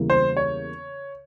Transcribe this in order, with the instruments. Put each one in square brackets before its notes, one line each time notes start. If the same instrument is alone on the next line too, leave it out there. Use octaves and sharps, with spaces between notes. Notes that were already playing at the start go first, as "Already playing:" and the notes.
Already playing: [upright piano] E2 C#3 G3 A#3 E4
[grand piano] C5
C#5